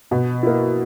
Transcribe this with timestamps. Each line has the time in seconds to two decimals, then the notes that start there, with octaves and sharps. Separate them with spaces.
0.11 B2
0.43 A#3 E4